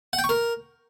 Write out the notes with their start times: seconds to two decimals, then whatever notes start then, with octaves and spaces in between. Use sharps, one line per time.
0.13 F#5
0.19 G5
0.24 C#6
0.29 A#4